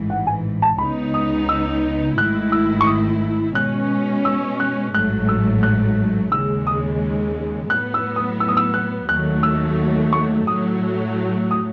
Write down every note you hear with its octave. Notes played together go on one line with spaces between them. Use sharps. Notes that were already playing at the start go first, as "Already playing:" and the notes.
Already playing: A1 G#2 E3
F#5
G#5
A5
C#2 C#3 G#3 B3 D#4 B5
D#6
E6
G#1 G#2 D#3 A3 E4 F#6
E6
C#6
D#6
B2 G#3 C#4 F#6
E6
F#6
A1 G#2 F#3 A3 F#6
E6
F#6
D#2 C#3 G#3 E6
D#6
A2 F#3 B3 F#6
E6
D#6
E6
D#6
E6
F#6
D#2 D#3 F#3 A3 F#6
E6
C#6
A2 F#3 A3 D#6
D#6